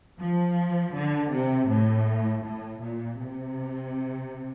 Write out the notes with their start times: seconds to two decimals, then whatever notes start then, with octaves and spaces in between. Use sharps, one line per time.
0.19 F3
0.94 D3
1.31 C3
1.68 A2
2.44 A2
2.81 A#2
3.18 C3